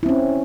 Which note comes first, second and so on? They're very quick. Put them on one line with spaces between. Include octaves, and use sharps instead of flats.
E4 C4 C#4